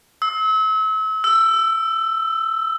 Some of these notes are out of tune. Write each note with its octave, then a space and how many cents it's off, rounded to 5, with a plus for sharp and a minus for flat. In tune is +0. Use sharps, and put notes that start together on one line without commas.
E6 -35
E6 +15